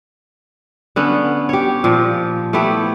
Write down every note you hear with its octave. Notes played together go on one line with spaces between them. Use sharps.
D3 B3 C#4
G4 C#5
A#2 F3
A3 B3 E4 G4